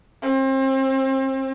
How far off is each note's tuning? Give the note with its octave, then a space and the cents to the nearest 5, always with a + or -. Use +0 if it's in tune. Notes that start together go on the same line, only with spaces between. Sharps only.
C4 +35